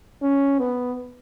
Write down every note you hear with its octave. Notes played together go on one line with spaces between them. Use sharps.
C#4
B3